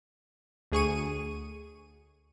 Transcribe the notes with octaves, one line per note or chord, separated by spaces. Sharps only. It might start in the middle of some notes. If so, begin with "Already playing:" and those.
D2 G#4 C#6 D#7